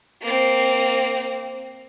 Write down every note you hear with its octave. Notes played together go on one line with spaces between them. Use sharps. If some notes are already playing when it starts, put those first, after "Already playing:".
A#3 C4